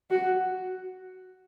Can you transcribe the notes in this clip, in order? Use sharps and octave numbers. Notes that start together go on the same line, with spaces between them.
F#4